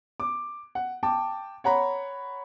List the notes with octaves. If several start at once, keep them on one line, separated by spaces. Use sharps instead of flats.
D6
F#5
G5 A5 D6
C#5 F#5 A#5 B5